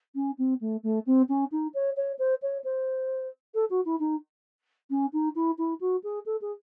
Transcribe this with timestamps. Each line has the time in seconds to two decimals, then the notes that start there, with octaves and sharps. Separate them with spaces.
0.15 C#4
0.38 C4
0.60 A3
0.83 A3
1.06 C4
1.28 C#4
1.51 D#4
1.74 C#5
1.96 C#5
2.18 C5
2.42 C#5
2.64 C5
3.54 A4
3.70 F#4
3.85 E4
3.99 D#4
4.90 C#4
5.13 D#4
5.35 E4
5.58 E4
5.80 F#4
6.03 G#4
6.25 A4
6.41 G#4